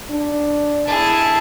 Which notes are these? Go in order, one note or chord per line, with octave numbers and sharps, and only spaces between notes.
D4
E4 G#4 A5